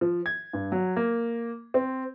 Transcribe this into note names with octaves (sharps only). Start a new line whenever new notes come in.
F3
G#6
G2
F#3
A#3
C4